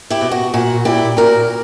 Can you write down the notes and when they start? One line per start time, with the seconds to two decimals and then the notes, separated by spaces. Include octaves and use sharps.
0.10 E4 G4
0.21 B2
0.31 F#4
0.54 A#2 F#4
0.85 A#2 E4 G4
1.17 A#2 F#4 A#4